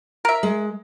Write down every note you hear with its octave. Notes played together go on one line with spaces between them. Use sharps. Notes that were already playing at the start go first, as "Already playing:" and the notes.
A#4 E5
G#3